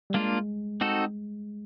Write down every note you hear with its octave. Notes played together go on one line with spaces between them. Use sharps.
G3
G#3 A#3 D4 F4
C4 D#4 F#4 A4